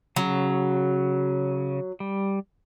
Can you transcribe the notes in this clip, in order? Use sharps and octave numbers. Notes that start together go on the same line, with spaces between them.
C#3 F#3
G3